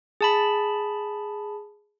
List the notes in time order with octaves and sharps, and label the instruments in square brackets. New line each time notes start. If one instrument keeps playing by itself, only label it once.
[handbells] G#4 A5 B5